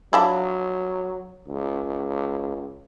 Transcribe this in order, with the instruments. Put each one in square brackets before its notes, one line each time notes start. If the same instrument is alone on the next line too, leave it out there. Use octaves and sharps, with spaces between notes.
[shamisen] F3 D4 E4 [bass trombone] F#3
[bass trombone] C#2